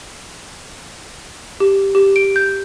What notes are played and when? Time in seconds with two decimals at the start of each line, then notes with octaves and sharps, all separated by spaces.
1.60 G4
1.95 G4
2.16 D7
2.36 G6